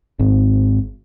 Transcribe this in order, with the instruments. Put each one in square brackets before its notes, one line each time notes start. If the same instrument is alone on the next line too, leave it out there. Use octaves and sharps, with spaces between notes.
[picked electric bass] G#1